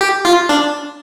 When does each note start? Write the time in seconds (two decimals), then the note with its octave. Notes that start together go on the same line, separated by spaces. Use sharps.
0.01 G4
0.25 F4
0.49 D4